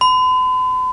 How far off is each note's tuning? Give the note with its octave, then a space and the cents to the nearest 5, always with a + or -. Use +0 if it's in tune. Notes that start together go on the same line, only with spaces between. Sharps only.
B5 +45